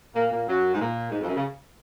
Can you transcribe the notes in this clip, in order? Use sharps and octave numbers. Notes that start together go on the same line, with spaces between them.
A#2 A#3
A#2 A#3
F#2 F#3
G#2
A#2
G#2
F2
F#2
C#3